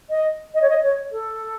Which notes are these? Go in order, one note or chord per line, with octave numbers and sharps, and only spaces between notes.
D#5
D#5
C#5
D#5
C#5
A4